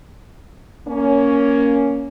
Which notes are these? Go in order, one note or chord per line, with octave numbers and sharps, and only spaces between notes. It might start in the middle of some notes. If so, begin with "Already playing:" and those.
A#3 C#4